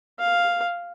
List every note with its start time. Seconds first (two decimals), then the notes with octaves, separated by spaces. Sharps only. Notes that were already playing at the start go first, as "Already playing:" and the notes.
0.19 F5